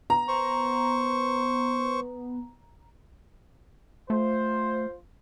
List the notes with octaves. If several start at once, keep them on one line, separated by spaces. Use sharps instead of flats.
B3 A#5
C5 C#6
A3 F4 C5